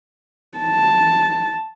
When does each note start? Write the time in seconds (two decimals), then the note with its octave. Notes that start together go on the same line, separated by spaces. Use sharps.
0.58 A5